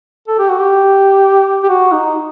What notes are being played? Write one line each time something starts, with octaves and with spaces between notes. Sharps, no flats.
A4
G4
F#4
G4
G4
F#4
D#4